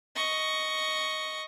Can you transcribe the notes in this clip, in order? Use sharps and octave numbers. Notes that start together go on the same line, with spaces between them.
D#5 C#6